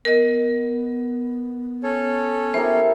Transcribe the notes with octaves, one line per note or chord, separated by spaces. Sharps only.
B3 A#4 D#5
C#4 A4 C#5
E4 G4 A#4 C5